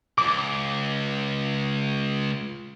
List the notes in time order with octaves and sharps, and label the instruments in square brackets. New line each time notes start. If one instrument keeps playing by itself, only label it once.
[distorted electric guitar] C#2 F#2 [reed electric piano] D6